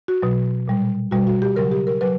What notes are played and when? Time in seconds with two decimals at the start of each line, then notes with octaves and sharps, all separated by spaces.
0.08 F#4
0.22 B2 F#3
0.68 A#2 G3
1.11 B2 G3 F#4
1.27 F#4
1.42 G4
1.56 C#3 F#3 A#4
1.72 G4
1.87 A#4
2.01 F#3 B4